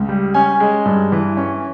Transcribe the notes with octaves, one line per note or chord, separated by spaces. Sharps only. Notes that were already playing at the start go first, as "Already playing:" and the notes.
Already playing: C#2
G3
C#4 G#5
G#3
G2
E3
C#4